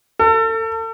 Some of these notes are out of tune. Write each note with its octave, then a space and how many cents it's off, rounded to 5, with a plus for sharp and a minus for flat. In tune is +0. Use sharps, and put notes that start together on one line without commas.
A4 +35